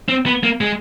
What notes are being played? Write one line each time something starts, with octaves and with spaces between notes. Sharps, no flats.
C4
B3
A#3
G#3